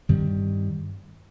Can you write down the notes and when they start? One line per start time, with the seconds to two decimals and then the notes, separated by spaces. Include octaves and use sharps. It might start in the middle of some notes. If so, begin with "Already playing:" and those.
0.09 G2 D#3 G3 C4